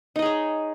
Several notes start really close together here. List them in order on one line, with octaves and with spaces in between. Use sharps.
D#4 D#5 G#4 C#5